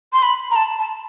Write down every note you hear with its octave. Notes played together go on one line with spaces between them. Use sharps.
C6
B5
A#5
A5
A5